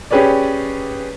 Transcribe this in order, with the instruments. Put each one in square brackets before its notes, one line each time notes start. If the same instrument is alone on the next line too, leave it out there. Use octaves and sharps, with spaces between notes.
[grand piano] C#4 G4 G#4 B4 C#5 D5